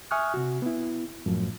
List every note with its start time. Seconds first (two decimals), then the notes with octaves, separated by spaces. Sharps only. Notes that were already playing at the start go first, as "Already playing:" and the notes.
0.11 E5 G#5 C#6 D#6 F6 F#6
0.34 C3 F#4
0.62 B3 E4
1.26 F#2 A2 F3